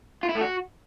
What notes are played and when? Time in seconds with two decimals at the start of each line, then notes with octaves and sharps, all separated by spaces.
0.23 F4
0.29 E4
0.35 A3
0.41 F#4